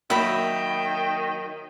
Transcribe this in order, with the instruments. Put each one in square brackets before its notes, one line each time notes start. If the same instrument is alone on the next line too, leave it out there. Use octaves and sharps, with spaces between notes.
[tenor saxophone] D#3 [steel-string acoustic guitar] F#3 A#3 F#4 [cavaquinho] E5 B5 [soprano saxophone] G5